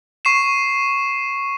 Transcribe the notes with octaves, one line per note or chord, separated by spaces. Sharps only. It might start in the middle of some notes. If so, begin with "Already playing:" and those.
C#6 C7 E7